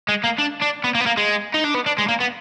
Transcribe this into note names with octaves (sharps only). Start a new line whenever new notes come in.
G#3
A#3
D4
D4
B3
A#3
B3
A#3
G#3
D#4
D4
B3
D4
G#3
A#3
B3